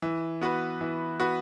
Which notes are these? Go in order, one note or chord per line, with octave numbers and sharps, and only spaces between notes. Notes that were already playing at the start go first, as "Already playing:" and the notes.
E3
B3 F#4 B4
E3
B3 F#4 B4